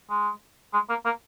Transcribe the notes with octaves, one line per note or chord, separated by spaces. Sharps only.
G#3
G#3
A#3
A#3